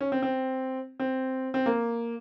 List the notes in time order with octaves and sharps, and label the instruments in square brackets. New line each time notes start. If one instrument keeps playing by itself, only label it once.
[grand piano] C#4
C4
C4
C4
C4
A#3